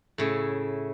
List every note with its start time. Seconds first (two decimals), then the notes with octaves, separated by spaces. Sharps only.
0.18 A2 C#3 E4